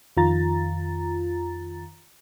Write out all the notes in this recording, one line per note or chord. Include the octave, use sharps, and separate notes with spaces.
F2 D#3 F4 A#5 A6